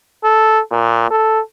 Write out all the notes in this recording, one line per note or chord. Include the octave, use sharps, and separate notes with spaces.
A4
A#2
A4